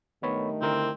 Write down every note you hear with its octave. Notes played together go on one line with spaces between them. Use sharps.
G2 D#3 A3 B3 C#5 B5
D3 C4 E4 A#4